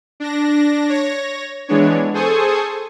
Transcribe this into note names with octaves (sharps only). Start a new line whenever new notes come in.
D4 A#6
C#5 A#6
E3 G#3 B3 D4 C#5
G#4 A4 C5 G#5 C#6 D#6